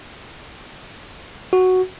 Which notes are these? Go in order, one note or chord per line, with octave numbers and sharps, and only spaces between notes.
F#4